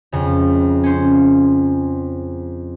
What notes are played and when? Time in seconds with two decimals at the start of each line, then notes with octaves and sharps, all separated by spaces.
0.12 F2 C#3
0.83 C#4 C5